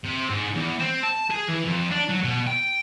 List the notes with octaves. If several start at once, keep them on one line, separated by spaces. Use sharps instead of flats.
C3
G#2
E2
C4
A5
G#4
E3
F2
D4
F#3
B2
G5